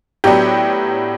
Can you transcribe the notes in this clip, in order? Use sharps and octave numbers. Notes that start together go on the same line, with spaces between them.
A2 F#3 B3 D4 G4